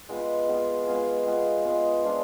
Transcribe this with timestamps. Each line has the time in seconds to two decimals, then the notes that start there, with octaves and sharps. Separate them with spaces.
0.09 G#3 B3 F4 B4
0.48 G#3 B3 F4 G#4
0.87 G#3 B3 F4 G#4
1.26 G#3 B3 F4 G#4
1.65 G#3 B3 F4 G#4
2.04 F3 G#3 D4 F4